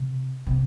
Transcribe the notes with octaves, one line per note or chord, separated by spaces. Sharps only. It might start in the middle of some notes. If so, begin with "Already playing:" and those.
Already playing: C3
C3